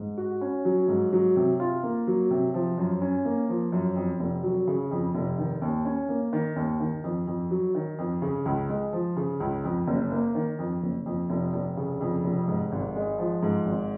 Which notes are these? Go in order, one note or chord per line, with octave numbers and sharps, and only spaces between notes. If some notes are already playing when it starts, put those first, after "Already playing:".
Already playing: G#2
F#4
C#4
F#3
G#2
F#3
C3
F4
A#3
F#3
C3
F3
F#2
C#4
A#3
F3
F#2
F2
F1
F#3
C#3
F2
F1
D#3
D#2
C#4
A#3
D#3
D#2
D#3
F2
F2
F#3
D#3
F2
C#3
C#2
G#3
F3
C#3
C#2
F2
F#1
A#3
D#3
F2
F#1
F2
F1
F1
C#3
F2
F1
G#2
G#1
G#3
F3
G#2
G#1